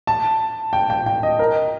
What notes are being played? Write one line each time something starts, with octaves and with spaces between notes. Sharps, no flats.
A5
G5
G5
G5
D#5
A#4